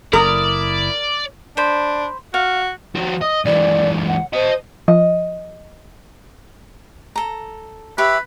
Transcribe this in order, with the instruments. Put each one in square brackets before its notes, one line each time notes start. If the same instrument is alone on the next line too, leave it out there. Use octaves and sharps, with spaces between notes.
[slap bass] F#1 [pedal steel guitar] E4 D#6 [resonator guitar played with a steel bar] A#4 [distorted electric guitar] D5
[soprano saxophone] D4 [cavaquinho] C5 B5
[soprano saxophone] F#4 [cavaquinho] F5
[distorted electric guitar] F3 F#4
[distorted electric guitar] D#5 [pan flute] D#6
[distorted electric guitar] C#2 E3 [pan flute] D5
[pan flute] F#5
[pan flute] C5 [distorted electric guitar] D#5 A5
[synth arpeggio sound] F3 [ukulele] D#5
[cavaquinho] A4 A#5
[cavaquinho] G4 C#5 B5 [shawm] B4 [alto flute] E5